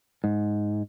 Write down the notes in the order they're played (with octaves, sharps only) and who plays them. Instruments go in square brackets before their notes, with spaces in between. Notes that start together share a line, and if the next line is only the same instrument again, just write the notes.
[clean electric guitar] G#2